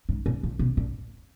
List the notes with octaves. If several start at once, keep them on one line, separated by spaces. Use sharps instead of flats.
G#2
A#2
A#2
B2
A#2